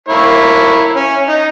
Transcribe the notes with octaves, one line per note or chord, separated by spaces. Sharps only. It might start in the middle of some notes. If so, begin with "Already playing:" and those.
A#3 E4 C#5
C#4
D#4